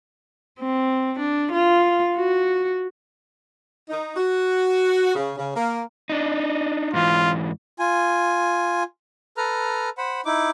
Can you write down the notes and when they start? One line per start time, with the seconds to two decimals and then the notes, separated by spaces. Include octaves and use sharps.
0.60 C4
1.19 D4
1.52 F4
2.16 F#4
3.89 D#4
4.16 F#4
5.15 C#3
5.38 C#3
5.56 A#3
6.10 D4 D#4
6.94 G#2 E3 F4
7.79 F4 G#5
9.37 A4 B4 A#5 F6
9.98 C5 F#5 B5
10.26 D#4 E4 D6